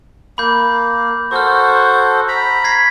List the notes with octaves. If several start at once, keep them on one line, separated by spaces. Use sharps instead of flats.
A#3 B5 G6
F#4 A4 C5 C#6 F6
A#5 B5
G#6 B6 C7